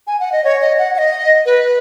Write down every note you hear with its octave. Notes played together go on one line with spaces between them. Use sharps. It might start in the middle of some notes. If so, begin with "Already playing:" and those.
G#5
F#5
D#5
C#5
D#5
F#5
F#5
D#5
B4